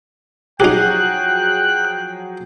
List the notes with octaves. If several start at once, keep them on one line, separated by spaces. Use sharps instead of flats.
F3 F#3 D#4 G4 G#4 G5 F#6